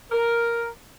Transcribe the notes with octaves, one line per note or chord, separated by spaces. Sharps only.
A#4